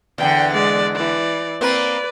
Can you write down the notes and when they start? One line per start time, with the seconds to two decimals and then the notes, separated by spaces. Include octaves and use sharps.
0.18 E2 B2 D3 G5
0.53 G#3 D5
0.95 E3 D5
1.61 A#3 C4 B4 D5